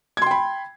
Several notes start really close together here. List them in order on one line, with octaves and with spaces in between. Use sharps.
G#6 C6 G5 B5